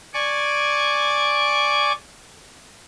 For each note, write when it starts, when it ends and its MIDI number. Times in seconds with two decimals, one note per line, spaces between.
0.14 1.92 74
0.14 1.92 80
0.14 1.92 85
0.14 1.92 86